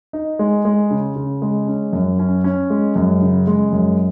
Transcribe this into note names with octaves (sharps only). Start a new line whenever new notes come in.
D#4
G#3
G#3
C#3
C#3
G#3
C#4
F#2
C#4
C#4
G#3
F#2
C#3
G#3
F#2